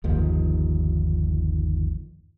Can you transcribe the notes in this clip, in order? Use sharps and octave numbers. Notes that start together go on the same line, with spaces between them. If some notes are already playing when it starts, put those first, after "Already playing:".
G1 D#2 D#3 F3